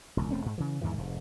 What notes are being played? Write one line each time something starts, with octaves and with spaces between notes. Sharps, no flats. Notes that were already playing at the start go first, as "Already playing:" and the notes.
E1 C#2
E1 A3 C4 C#4
G#2
C#3 E3
E2 G#2 D#3 E3
F1 G#2